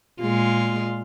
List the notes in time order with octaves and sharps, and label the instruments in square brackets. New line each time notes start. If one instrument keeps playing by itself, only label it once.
[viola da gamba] A#2 G#3 F4